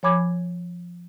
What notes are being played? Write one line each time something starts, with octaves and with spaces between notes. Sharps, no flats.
F3 C#5 G#5 B5 D6 G#6